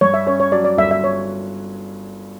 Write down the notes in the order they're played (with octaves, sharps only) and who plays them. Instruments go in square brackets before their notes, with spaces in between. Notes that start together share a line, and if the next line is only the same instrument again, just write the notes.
[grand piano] G2 [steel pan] C#5
[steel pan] E5
[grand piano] C#4 [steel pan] C#5
[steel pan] C#5
[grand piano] F#3 [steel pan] D5
[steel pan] D5
[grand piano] G1 [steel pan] E5
[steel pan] E5
C#5